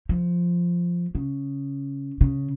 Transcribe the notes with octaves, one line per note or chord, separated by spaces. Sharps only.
F3
C#3
C#3